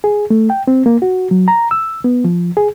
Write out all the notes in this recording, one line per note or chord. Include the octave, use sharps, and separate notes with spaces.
G#4
A3
G5
C4
A#3
F#4
F#3
A#5
E6
B3
F3
G#4